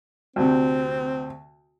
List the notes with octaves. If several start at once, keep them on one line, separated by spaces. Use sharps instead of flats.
D2 C3 C4